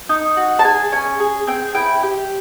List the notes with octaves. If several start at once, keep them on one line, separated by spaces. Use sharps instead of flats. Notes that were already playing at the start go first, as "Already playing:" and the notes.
D#4
F#4
A5
G#4 G#5
C#4 G#5
G#4
C4 G5
E4 G5
G4